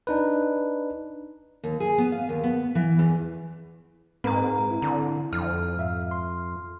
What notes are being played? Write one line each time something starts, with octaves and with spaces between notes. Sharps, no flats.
D4 D#4 B4
D#2
G#4
B3
F5
D#2
B3
E3
E2
G#2 C4 B4 A#5
E4
D3
F2 F6
G#2 E5 F5
C6